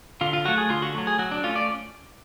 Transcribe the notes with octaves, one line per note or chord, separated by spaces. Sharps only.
D3 F4
F4
F#3 A3 F#4
G#4
D3 F4
F#4
F#3 A3
G#4
F#3 F#4
D4
A3 C#4 F4
D5